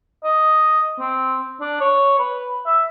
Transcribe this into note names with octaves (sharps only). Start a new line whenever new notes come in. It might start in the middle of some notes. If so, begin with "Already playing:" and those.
D#5
C4
D4
C#5
B4
E5